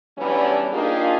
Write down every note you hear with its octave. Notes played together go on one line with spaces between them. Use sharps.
E3 F#3 G3 B3 C#4 D4
A#3 D4 D#4 F4 G4 G#4